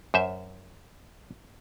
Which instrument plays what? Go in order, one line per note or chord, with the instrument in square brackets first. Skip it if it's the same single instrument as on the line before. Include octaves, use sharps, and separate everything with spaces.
[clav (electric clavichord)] F#2 C5 E5